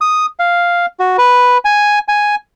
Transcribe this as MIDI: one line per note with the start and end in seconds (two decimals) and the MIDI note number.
0.01 0.26 87
0.39 0.86 77
1.00 1.17 66
1.18 1.58 71
1.65 1.99 80
2.08 2.35 80